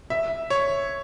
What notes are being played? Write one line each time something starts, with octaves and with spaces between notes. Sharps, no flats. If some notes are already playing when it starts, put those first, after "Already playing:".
E5
C#5